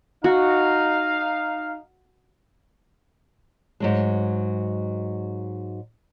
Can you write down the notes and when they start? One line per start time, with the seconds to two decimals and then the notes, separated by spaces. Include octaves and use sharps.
0.24 D#4 F#4 F5
3.80 G#2 F#3 G#3